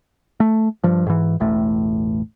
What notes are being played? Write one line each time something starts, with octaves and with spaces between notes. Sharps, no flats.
A3
G2 F3
G#2 E3
E1 A1 A2 A3